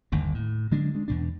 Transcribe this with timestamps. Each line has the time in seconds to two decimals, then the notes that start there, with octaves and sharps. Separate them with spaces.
0.12 G1 D#2 D3
0.34 A2
0.71 D3 F#3 G#3 D4
0.95 G#3 D4
1.08 E2 B2 D4